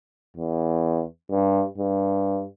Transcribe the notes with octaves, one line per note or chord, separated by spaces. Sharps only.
E2
G2
G2